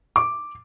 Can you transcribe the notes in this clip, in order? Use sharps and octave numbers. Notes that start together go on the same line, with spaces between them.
D6